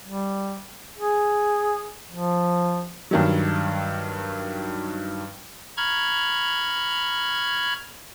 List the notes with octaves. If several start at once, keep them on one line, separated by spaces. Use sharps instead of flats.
G3
G#4
F3
G2 D#3 F#3
A#5 B5 C#6 F6 G#6